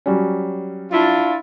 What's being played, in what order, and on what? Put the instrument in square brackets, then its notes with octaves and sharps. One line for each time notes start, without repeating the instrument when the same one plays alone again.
[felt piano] F#3 G3 C#4
[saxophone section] D4 E4 F4